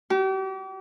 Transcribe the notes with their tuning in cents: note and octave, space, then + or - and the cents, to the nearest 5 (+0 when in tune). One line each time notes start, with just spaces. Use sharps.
G4 -40